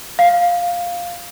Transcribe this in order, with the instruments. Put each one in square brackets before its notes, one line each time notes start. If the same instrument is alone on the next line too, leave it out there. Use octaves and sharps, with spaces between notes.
[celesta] F5